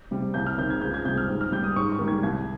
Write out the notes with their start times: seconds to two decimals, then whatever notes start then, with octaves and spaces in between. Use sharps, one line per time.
0.11 C3 G3
0.34 C2 G6
0.47 F6
0.58 C3 D#3 G6
0.70 G#6
0.82 C#2 G6
0.94 G#6
1.05 C3 G3 G6
1.18 F6
1.28 G#2
1.41 F6
1.52 G3 G6
1.64 D#6
1.76 G#2 C#6
1.92 C#6
1.99 D#3 G3
2.08 G#6
2.23 C2 G#6